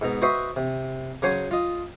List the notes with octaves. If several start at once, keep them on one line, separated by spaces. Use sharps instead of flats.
G#2 B2 A#5
F#4 B4 C5 D#5 E5 C#6
C3
C#3 F#3 F#4 C5 C#5 G#5
F4 D#5